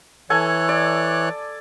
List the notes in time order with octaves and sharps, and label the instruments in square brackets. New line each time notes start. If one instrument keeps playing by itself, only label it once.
[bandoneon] E3 C#5 F#6 [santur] A4 G#5
[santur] D5